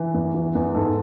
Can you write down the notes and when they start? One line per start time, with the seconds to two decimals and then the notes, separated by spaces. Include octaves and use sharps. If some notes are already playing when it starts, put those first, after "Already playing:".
Already playing: E3
0.14 E2
0.34 E3
0.55 E2
0.74 G#2 A4